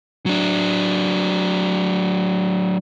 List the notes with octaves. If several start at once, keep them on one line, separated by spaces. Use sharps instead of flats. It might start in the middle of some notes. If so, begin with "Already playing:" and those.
F#3 D4